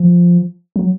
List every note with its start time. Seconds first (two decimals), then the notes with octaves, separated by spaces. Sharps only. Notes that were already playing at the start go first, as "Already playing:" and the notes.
Already playing: F3
0.76 F#3